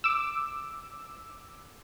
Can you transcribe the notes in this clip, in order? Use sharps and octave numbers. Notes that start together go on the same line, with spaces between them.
D6 E6